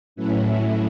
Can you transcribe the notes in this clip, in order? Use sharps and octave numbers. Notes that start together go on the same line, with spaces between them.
A2 F#3 A3 C#4 E4 B4